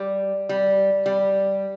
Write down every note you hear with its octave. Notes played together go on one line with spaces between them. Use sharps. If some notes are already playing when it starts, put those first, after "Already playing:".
Already playing: G3
G3
G3